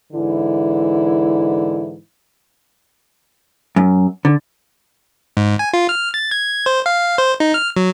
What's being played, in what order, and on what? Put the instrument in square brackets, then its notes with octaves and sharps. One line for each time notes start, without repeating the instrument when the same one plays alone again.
[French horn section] G#2 D3 E3 E4
[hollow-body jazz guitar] F#2
D3
[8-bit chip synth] G#2
G#5
F4
F6
A6
G#6
C5
F5
C5
D#4
F6
F#3